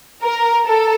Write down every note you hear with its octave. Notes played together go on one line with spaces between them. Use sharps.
A#4
A4